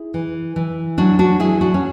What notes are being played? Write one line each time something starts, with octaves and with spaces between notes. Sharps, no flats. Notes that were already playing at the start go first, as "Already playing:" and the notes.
Already playing: E4 G#4
E3
E3
F#3 D4 F#4
D4 F#4
F#3 E4 G#4
D4 F#4
C#4